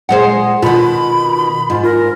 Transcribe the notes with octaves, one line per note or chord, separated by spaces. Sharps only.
A#2 G#3 C5 F#5
B2 D#3 F4 B5
G#2 F4
F4 A#4